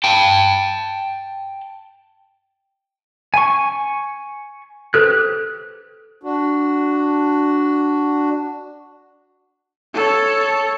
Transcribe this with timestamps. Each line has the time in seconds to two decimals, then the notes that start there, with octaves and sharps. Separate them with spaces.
0.04 G5 A5
3.34 G#5 C#6
4.94 G4 A4 B4 C5 F#6
6.23 D4 F#4
9.94 A4 C#5